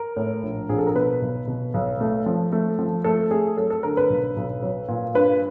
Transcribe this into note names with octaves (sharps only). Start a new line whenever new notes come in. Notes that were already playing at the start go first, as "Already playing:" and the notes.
Already playing: A#4
A2
A#1
A#1 G#4
A4
A#4
B2 B4
B1
B2
B1
A3
F3
A3
F3
A3 A4
A3 G#4
F#3 A4
A4
D3 A#4
B4
B1
B1
F#3
A#2
G2 B4